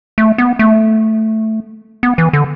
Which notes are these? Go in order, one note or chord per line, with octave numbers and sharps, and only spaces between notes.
A3
B3
A3
B3
E3
D3